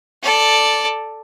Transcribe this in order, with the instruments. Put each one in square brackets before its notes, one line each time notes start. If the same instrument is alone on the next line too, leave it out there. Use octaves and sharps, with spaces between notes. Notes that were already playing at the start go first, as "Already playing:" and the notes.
[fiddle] A4 D5